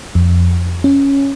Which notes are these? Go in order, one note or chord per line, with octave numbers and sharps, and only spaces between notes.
F2
C#4